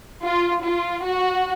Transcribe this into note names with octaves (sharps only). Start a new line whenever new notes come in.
F4
F4
F#4